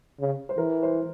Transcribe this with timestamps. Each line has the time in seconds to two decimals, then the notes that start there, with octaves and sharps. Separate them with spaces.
0.20 C#3
0.49 C5
0.57 E3 A#4
0.83 C5